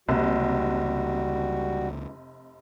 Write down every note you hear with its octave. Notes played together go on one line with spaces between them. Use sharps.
F1 C#2 G3 A#3 F#4